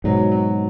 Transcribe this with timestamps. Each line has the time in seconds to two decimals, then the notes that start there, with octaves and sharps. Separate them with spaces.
0.04 G#2 B2 F#3
0.32 F#3